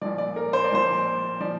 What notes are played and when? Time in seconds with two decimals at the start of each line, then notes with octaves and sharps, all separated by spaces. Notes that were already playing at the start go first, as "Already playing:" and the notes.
0.01 A#1 A#2 F3 D5
0.18 D5
0.36 A#4
0.53 C5
0.64 D5
0.71 A#1 A#2 F3 C5
1.40 A#2 F3 D5